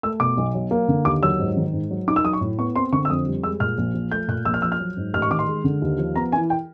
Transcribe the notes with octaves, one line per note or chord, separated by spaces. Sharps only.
A3 E6
B2 D6
B1
F#3
A#3
D3
D#2 D6
F#3 E6
G#2
D#3
G#2
F#3
D#4 D6
E6
F#3 D#6
C#6
A2
B3 C#6
C4 C6
D3 C#6
E6
F2 D#6
G3
G#3 E6
A#2 F6
A#1
F3
A3 G6
A#2 F#6
A#1 E6
F6
F3 E6
F6
F#3
G#2
A1 F6
C#6
D#3 D6
C6
G#3
D3
D#2
F3
B3 A#5
E3 G#5
G5